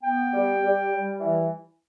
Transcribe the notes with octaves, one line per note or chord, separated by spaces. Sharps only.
B3 G5
G3
G3
G3
E3